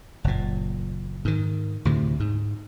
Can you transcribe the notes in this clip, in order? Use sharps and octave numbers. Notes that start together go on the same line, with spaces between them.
F#1 A#2
G#2 D#3
D2 A2 C3
G#2